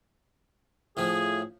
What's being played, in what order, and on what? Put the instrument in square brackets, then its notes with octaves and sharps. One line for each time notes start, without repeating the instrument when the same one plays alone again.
[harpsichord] A2 F3 [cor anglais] G#4